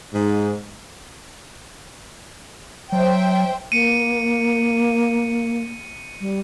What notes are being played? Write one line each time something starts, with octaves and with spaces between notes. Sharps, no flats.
G#2
F#3 C5 E5 G5
A#3 C#7 D#7
G3